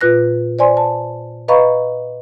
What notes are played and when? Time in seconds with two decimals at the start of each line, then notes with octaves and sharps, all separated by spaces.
0.01 A#2 F4 B4 F#6 A#6
0.59 C5 D5 G#5 C6
0.77 A5
1.48 B4 D#5 F5 A#5 B5 C#6